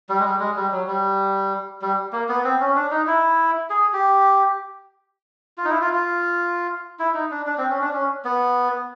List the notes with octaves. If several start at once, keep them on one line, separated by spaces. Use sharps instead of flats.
G3
G#3
G3
G#3
G3
F#3
G3
G3
A#3
B3
C4
C#4
D4
D#4
E4
G#4
G4
F4
D#4
E4
F4
F4
E4
D#4
D4
D4
C4
C#4
D4
C#4
B3